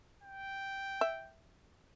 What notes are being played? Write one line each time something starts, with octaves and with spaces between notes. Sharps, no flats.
G5
E5